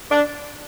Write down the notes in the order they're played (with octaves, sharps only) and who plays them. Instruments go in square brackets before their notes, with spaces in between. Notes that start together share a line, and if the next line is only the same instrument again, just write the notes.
[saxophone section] D4